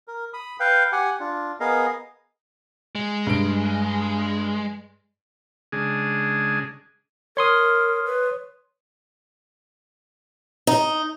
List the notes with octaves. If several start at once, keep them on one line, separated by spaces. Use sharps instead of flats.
A#4
B5 D#6
B4 F5 G5
G4 F#5 G#5
D4 F4
B3 G#4 A#4 D#5 F5
G#3
G2 D7
C#3 G#3 D4 G#4
A#4 C#5 C6 D#6
B4
D#4